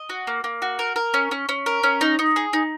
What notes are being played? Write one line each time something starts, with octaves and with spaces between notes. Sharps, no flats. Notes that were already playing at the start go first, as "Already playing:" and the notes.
Already playing: D#5
F#4
A#3
A#3
F#4
A#4
A#4
C#4
C#4
C#4
A#4
C#4
D#4
D#4
G#4
D#4